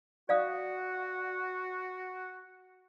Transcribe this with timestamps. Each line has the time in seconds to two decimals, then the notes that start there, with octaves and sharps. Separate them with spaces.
0.29 F#4 D5 F5 D#6